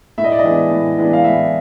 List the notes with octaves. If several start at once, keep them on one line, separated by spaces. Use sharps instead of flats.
A2 E5
D#5
D5
D#5
E3 G#3 B3 D4
A2
E3 G#3 B3 D4
F5
A2 E5